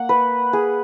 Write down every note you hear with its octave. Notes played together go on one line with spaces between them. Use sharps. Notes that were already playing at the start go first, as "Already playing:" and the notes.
Already playing: A#3 F#5
B4
G#4